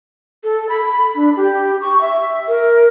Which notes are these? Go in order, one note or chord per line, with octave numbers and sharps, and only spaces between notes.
A4
B5
D4
G4
C#6
E5
A#4